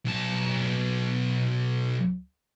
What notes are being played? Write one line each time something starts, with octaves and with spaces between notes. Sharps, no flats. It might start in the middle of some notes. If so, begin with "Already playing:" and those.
B1 A5